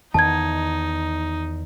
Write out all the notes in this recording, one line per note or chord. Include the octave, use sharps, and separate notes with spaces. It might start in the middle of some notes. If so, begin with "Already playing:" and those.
E2 D#3 D#4 A5 G#6